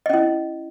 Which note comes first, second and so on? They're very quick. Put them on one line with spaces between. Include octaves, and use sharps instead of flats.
D#5 C#4 E4